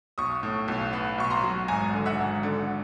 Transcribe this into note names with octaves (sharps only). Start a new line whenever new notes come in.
B1 C#6 D#6
A2
B1
B3
B1 C#6
A#5 C6
F#3
G#1 G#5 A#5
D3
E5 F#5
G#1
D3